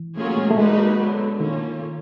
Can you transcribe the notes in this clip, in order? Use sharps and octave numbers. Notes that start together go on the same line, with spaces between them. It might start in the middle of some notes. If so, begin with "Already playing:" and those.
Already playing: E3
F#3 A3 A#3 C#4 F4 G#4
G#3
A3
G3 G#3 A#3 D#4 F#4 B4
D3 F#3 B3
D#3 A#3 C#4 F4 A4